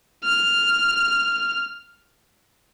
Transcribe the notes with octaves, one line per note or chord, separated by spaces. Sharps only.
F6